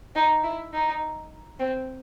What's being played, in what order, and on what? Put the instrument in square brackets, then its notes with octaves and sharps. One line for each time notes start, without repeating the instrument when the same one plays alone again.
[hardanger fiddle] D#4
E4
D#4
C4